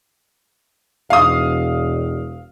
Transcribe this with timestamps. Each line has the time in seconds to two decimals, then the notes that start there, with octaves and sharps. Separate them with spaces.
1.10 E1 F5 D#6